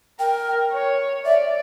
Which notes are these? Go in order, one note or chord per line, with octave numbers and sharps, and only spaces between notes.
A#4 G5
C#5
D5 E5